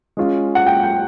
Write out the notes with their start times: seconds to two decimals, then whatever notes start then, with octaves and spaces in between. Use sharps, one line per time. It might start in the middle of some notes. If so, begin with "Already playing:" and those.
0.17 G#3 C#4 F4
0.55 F#5
0.66 G5
0.83 G5